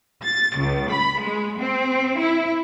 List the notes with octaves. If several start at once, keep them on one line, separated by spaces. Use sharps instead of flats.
A6
C#2
B5
G#3
C4
E4